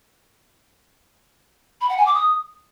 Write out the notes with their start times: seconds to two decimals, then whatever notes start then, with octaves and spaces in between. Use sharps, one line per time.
1.81 B5
1.89 F#5
1.98 G#5
2.06 D6
2.14 D#6